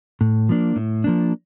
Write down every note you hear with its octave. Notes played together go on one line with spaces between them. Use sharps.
A2
F3 A#3 D4
A2
F3 A#3 D4